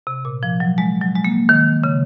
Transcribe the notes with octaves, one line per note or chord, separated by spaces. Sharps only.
C3
A#2
F3
F#3
G#3
F#3
G#3
A#3
D#3
C#3